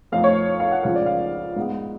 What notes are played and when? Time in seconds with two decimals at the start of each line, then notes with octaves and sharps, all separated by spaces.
0.12 F2 F3 A3 F5
0.24 C#5
0.60 F5
0.72 F#5
0.83 C#2 C#3 F3 F5
0.96 D5
1.06 F5
1.56 G#2 G#3 B3